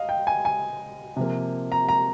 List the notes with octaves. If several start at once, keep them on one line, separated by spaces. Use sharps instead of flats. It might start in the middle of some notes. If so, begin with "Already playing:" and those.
Already playing: D#5 F5
G5
G#5
G#5
C3 F3 A#3
A#5
A#5